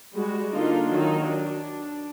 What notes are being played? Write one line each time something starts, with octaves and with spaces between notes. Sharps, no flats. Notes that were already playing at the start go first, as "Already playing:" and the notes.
G3 G#3 F#4
D3 A#3 D4 D#4 F4
D#3 F#3 D#4
D4